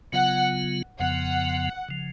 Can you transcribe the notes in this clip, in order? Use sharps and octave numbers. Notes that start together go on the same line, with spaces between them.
C#3 F#3 B3 F4 F#5
F2 C#3 F3 B3 F#5
C#3 F3